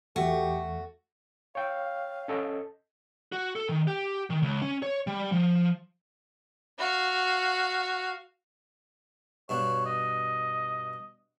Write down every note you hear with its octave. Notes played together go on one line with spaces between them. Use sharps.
E2 A3 F#4 G4
C#5 F5 G5
C#4 A4 D#5
F#4
A4
D#3
G4
D#3
C#2
C#4
C#5
G3
F3
F#4 F5
G2 B2 D4 C#5
D#5